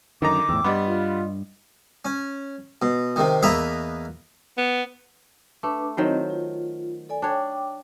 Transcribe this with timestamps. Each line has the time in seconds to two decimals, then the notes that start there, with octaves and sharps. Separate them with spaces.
0.22 F#2 D3 D#3 D#4 A#4 A#5 D6
0.49 E2 A2 G5 E6
0.64 G2 G3 B3 D5 D#5 C6
0.87 F4
2.05 C#4
2.82 B2
3.16 C3 D#3
3.43 E2 A#3 B4 D#5 E5 A#5
4.57 B3
5.63 A3 D4 B4 D6
5.97 D#3 F#3 C4 E4 C5 D#5
6.30 F4
7.09 A4 D5 G#5
7.22 D4 C#5 G5 D6